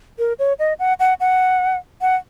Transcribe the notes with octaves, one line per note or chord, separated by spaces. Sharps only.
A#4
C#5
D#5
F#5
F#5
F#5
F#5